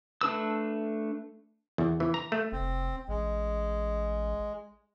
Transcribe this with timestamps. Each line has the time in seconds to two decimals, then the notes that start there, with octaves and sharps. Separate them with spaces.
0.21 A3 D4 B4 E6
1.78 E2
2.00 E3
2.14 A#5
2.32 A3
2.52 F1 C4
3.08 A1 G#3